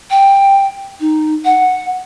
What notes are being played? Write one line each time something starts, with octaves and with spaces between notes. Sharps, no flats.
G5
D#4
F#5